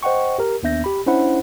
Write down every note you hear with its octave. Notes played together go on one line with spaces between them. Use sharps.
C5 D#5 F#5 G5 C#6
G4 A#4
D#2 B3 D4 E5 G6 A#6
G4 B5
C#4 D4 E4 C5 F#5 B5